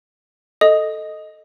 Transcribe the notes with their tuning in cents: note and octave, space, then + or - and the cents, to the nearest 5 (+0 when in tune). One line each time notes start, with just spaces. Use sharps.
A4 +0 D#5 +0 D#6 +0